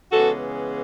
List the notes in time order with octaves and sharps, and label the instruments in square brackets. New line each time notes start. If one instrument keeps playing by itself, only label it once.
[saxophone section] C#3 E3 G#3 B3 F#4 A4